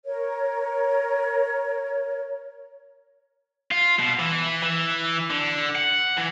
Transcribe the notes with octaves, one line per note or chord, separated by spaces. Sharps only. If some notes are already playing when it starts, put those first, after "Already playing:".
A#4 C#5
F4
B2
E3
E3
D3
F#5
E3